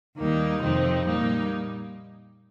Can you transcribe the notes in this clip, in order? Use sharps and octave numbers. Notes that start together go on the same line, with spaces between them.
D#2 D#3 G3 A#3 D#4
F2 C3 D#3 C4 D#4
A#2 G3 A#3 D#4